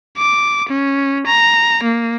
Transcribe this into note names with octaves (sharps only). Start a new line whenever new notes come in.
D6
C#4
A#5
A#3